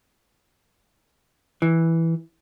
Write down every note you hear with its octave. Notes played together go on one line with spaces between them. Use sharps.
E3